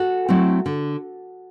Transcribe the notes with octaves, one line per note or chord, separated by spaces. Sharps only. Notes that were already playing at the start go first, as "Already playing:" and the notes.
Already playing: F#4 A4
F#3 A3 C4 E4
D3